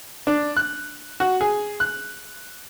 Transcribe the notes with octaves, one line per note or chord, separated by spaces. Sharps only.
D4
F#6
F#4
G#4
F#6